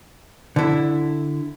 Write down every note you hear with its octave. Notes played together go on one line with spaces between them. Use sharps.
D3 E4